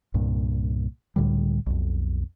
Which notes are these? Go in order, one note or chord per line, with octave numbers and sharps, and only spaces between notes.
C2 G2 A#2
C#2 A2 D3 G3
B1 F2